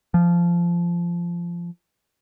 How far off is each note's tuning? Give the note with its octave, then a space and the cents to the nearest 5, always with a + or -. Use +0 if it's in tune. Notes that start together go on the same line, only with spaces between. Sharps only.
F3 -15